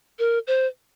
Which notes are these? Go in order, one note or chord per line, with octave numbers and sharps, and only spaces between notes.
A#4
C5